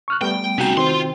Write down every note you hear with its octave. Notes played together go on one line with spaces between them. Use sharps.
C#6 F6 F#6
G3 A3 B3 G5
C3 C#4 D#4 F#4 G5
D#3 C4 F4 C6